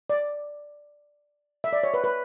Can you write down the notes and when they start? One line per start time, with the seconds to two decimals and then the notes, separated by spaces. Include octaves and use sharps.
0.10 D5
1.64 E5
1.73 D5
1.83 C#5
1.94 B4
2.04 B4